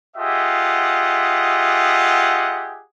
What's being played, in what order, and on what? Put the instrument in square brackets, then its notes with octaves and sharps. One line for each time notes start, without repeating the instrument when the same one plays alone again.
[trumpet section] F4 G4 G#4 D#5 E5 F#5